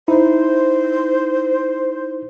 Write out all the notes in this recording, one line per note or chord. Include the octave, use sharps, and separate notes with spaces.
D#4 E4 C5